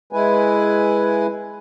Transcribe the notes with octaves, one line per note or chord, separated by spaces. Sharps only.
G#3 E4 B4 G#5